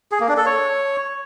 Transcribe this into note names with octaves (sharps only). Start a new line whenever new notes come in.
G#4
A#3
D4
A4
C#5